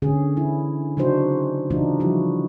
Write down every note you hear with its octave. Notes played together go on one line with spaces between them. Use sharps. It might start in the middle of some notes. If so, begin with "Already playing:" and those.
D3 C#4 G#4
E4
C#3 F#3 D4 D#4 F#4 C5
C#3 E3 A3 D4 D#4 F4
F3 G3 E4 F#4